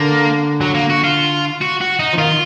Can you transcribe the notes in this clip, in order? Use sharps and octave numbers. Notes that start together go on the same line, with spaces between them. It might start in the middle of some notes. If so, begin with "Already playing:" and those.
Already playing: D3 A#3
F#3
A#3
F#4
F4
F#4
F#4
D#4
F3
D#3 F4